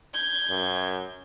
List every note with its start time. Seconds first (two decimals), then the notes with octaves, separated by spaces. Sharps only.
0.14 G6 G#6
0.50 F#2